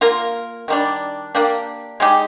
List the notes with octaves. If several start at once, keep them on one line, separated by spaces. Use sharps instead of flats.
A#3 F4 A#4
D#3 G3 D4
A#3 D4 G4
G#3 D#4 G4